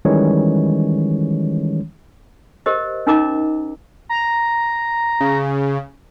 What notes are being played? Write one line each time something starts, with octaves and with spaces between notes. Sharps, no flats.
D#3 E3 G3 G#3 C#4 C#5
G4 A#4 C5 D#5
C#4 D#4 A#4 D#5 A#5 D6
A#5
C#3